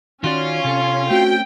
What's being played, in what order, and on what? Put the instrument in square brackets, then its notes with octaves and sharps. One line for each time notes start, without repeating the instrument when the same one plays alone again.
[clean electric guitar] D#3 F#4 D5 [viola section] C#4 [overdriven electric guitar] F4
[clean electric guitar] C3 A4
[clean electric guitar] A3 C4 C#4 [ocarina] F#4 [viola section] G5